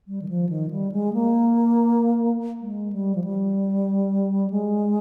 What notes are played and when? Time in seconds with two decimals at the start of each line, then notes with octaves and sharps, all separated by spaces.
0.08 G3
0.22 D#3
0.28 F3
0.49 D#3
0.70 G3
0.92 G#3
1.13 A#3
2.60 G#3
2.92 G3
3.15 F3
3.24 G3
4.50 G#3